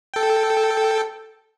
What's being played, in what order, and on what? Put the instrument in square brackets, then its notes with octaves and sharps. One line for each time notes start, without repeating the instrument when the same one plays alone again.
[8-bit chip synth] A4 G5